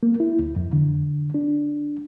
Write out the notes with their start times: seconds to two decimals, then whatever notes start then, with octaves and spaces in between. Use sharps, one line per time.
0.03 A#3
0.20 E4
0.39 D2
0.56 F2
0.73 D3
1.34 D4